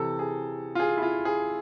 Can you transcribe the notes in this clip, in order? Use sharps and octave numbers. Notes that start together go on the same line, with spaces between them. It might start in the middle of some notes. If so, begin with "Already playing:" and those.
Already playing: C3 E3 A4
G#4
F4
G#4
E4
F4
G#4